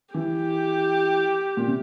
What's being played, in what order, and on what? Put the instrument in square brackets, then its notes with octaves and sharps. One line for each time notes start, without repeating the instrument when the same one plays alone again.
[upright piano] E3 [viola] G4
[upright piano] A#2
C3